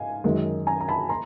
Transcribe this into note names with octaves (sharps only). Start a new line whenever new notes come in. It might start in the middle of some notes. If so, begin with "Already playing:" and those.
Already playing: G#2 F5 G#5
F#2 D#3 G#3
G#5 A#5
A#5
A5 B5
A#5 C6